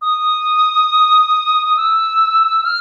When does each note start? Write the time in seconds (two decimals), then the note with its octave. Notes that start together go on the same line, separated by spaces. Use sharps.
0.02 D#6
1.66 D#6
1.77 E6
2.65 F6